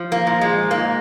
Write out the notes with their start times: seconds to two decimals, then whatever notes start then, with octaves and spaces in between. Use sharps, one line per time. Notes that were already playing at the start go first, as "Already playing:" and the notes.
Already playing: F3
0.12 A#3
0.27 A#2
0.41 G#3
0.71 G#2 A#3